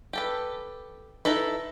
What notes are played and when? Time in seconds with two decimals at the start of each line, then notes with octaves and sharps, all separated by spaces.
0.13 G4 A4 B4
1.25 D#4 E4 A4 B4